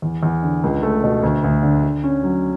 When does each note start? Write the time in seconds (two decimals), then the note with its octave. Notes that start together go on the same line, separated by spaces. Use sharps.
0.02 E2
0.23 E2
0.43 D3
0.63 C#2
0.83 A3
1.04 B2
1.23 D2
1.44 D2
1.63 D3
1.83 D3
2.04 C#4
2.23 F#3